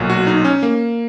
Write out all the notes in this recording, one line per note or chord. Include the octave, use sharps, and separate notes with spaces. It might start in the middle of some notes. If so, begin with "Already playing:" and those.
Already playing: B1 A#2 F#3
F#4
D#4
C#4
A#3